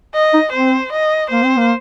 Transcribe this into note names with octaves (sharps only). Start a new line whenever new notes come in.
D#5
D#4
C4 C5
D#5
A#3 C5
C4
A#3